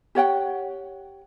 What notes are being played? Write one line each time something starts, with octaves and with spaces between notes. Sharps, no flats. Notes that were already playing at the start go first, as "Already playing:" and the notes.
G4 C#5 F#5 G5